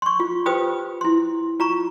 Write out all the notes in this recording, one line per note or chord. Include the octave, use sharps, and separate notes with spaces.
C6 C#6
F4
F4 G4 B4 C5 G5 D#6
E4 C6
F4 A#5 C#6